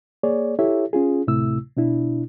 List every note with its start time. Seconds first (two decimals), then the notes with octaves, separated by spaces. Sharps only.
0.23 A#3 G#4 C#5 D5
0.59 E4 G4 A4 C#5 E5
0.93 C#4 F4 G#4
1.27 D2 A2 C3 A3 E4 E6
1.77 B2 D4 E4